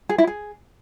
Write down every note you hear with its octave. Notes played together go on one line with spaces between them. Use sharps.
G#4
E4
G#4